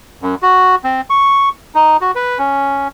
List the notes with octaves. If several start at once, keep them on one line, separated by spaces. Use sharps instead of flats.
F#2
F#4
C4
C#6
D#4
F#4
B4
C#4